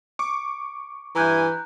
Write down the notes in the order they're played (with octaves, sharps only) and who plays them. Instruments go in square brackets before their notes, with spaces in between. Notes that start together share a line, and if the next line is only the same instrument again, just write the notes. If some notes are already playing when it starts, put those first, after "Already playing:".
[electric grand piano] C#6 D6
[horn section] G2 E4 G#5 [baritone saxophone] E3 [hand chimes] A#5 F#6 G6